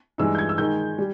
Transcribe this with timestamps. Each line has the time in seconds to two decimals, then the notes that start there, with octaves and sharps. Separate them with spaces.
0.18 G2 E3 G#3 D#4 E6
0.35 G6
0.38 G#6
0.49 E6
0.58 D#3 G#3 D#4 G6
0.98 G3